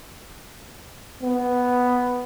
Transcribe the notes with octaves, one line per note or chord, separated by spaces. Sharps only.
B3